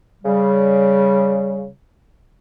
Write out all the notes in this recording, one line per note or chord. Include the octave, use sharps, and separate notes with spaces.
C#3 G3